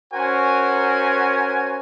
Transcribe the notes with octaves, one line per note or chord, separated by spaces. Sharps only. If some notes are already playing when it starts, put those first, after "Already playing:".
C#4 F#4 A#4 C5 G#5